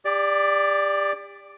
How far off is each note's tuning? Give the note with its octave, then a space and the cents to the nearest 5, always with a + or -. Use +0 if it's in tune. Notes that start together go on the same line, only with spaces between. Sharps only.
G4 +35 D5 +0